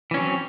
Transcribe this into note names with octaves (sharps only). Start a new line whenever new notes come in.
E3 F#3 C4 C#4